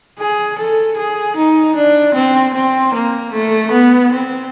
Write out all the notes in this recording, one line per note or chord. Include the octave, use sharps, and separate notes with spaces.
G#4
A4
G#4
D#4
D4
C4
C4
A#3
A3
B3
C4